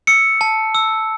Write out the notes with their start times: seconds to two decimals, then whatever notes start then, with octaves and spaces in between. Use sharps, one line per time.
0.07 E6 C#7
0.41 A5
0.75 E6